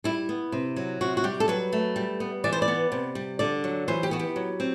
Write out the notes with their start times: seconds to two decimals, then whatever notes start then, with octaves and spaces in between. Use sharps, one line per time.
0.04 G3 E4
0.29 B3
0.52 C3
0.76 F#3
1.01 C3 F#4
1.17 F#4
1.24 G3 G4
1.40 A4
1.48 F#3 B4
1.72 A3
1.96 G3
2.20 B3
2.44 E3 D5
2.52 C5
2.62 D5
2.68 B3
2.92 C3
3.15 G3
3.39 D3 D5
3.64 F#3
3.88 E3 C5
4.03 G4
4.11 B3 F#4
4.19 G4
4.36 F#3
4.60 C4